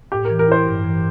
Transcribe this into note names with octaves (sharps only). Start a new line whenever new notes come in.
A2 G4
A#4
E3
A#4
E4 C5
G2
E3